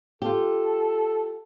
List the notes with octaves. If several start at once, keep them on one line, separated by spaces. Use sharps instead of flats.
F4 G4 A4